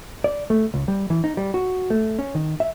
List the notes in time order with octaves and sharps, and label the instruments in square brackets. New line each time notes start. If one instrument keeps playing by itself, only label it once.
[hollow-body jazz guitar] D5
A3
C#2
G3
E3
D#4
G3
F#4
A3
C#4
D#3
E5